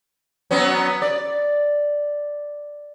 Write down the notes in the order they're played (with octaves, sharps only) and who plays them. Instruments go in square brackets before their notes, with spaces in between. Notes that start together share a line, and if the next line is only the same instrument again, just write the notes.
[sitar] F#3 B3 C#4
D5